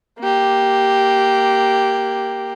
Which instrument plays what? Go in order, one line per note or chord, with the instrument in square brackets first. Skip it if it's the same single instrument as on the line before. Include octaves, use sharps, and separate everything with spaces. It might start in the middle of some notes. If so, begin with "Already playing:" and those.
[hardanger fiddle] A#3 G4